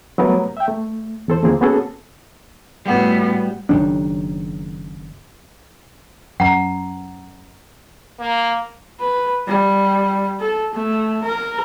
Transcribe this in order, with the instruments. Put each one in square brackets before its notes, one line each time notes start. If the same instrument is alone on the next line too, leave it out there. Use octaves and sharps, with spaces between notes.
[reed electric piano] F#3 G3 A3 B3 A#4 B4
E5 G5
A3
E2 A4 C5
D#2 D3 F3 A#3 C4 G#4
A#3 B3 C#4 F#4 G#4 A4
[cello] A2 B3 [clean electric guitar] G3 F#4
[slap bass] F#1 D#3 F#3 D4
[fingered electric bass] F#2 [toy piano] F#5 A#5
[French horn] A#3
[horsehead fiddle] B4
G3
A4
A3
A#4